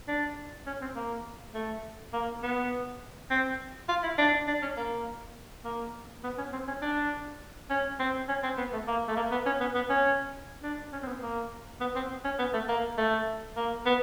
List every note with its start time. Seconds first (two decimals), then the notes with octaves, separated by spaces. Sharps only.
0.08 D4
0.66 C#4
0.81 C4
0.96 A#3
1.54 A3
2.13 A#3
2.43 B3
3.30 C4
3.89 F4
4.03 E4
4.18 D4
4.47 D4
4.62 C#4
4.77 A#3
5.65 A#3
6.24 B3
6.38 C#4
6.53 C4
6.67 C#4
6.82 D4
7.70 C#4
8.00 C4
8.28 C#4
8.43 C4
8.58 B3
8.73 A3
8.87 A#3
9.08 A3
9.17 A#3
9.31 B3
9.46 C#4
9.60 B3
9.75 B3
9.90 C#4
10.63 D4
10.93 C#4
11.03 C4
11.07 B3
11.22 A#3
11.81 B3
11.96 C4
12.24 C#4
12.39 B3
12.54 A3
12.68 A#3
12.98 A3
13.57 A#3
13.86 B3